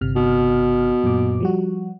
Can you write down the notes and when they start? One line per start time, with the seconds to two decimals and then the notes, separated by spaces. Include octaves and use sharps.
0.01 G1 C3 F6
0.16 B2
1.03 F#2 A#2 D6
1.40 F3 G3 F#4